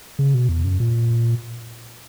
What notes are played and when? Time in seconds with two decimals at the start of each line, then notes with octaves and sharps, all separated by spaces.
0.19 C#3
0.34 B2
0.49 E2
0.64 F#2
0.80 A#2